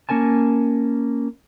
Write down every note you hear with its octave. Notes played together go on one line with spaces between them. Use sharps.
A#3 C#4 A#4 G#5 A5